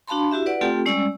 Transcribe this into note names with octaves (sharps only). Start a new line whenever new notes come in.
D4 F#4 F5 A5 B5 C6
E4 F#4 G4 E5
B4 D5 F#5
A3 C4 F4 G4 A4 G5
G3 G#3 C#4 D5 E6